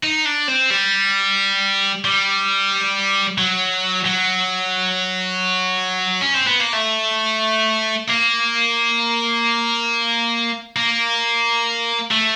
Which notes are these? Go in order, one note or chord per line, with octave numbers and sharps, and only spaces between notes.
D#4
D4
C4
G3
G3
F#3
F#3
C#4
C4
B3
A#3
A3
A#3
A#3
A3